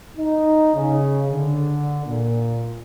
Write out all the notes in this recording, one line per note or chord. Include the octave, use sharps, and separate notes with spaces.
D#4
C#3
D3
A#2